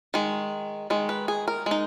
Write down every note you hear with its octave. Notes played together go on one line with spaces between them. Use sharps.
D#3 G#3
D#3 G#3
B4
G#4
A#4
G#3 D#4